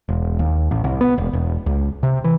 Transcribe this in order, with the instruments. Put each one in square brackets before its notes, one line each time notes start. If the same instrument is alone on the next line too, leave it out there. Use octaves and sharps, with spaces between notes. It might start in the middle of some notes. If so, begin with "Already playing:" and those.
[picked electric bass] E1
D#2
A1
C2
B3
E1
E1
C#2
C3
E3